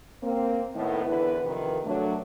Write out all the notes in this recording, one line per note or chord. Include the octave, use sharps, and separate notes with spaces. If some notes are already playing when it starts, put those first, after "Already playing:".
A#3 C4
A2 D#3 B3
E2 D3 E4 B4
F2 C3 D#3
F#3 A3 D4